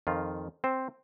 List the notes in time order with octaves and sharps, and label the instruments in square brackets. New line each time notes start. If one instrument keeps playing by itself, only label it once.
[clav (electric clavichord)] F2 D#3 F4
C4 C5